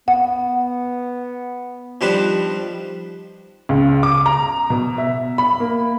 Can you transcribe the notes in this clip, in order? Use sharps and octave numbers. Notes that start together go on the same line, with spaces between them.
B3 F#5
D#3 F3 G3 D4 B4
C#2
D6
A#5
B2
E5
B5
A#3